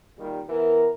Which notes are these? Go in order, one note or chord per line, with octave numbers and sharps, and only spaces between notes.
A#2 D#3 G3
E3 B3 A#4